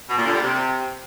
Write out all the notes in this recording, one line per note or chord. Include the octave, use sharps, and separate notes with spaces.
B2
A#2
D3
G3
C3